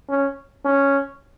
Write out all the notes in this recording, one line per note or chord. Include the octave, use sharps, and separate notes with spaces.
C#4
C#4